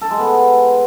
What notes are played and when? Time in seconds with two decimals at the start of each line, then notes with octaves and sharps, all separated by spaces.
0.01 A4
0.10 G#3
0.19 B3